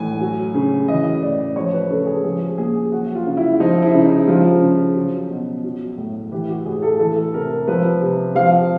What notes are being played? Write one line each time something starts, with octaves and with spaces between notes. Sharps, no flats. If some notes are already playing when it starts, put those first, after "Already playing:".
Already playing: A2 E3 G#5
F#3
C#3
E3 D#5
A2 D5
F3 C#5
B4
C#3 A4
G#4
F3 G#4
A#2 G#4
F#3 F#4
F4
C#3
E4
F3 D#4
E4
C#3
D#4
F3 F4
C#3
F#3
B2
F#3
A2
E3 G4
F#4
A2 G#4
A4
E3 A4
C3 A#4
F3 B4
C3
F3 F5